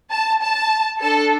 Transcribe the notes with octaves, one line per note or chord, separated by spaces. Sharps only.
A5
A5
D4 A4 A5